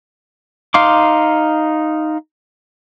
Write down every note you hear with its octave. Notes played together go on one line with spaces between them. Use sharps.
D#4 F5 C6 D6